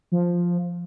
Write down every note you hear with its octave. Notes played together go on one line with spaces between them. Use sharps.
F3